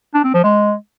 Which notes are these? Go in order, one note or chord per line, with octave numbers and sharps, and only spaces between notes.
D4
C4
F3
G#3